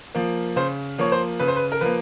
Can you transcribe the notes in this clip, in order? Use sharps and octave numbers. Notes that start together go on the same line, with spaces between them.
F3 A#3
C#3 C5
F3 A#3 C#5
C5
C#3 B4
C5
B4
A#4
F3 A#3 B4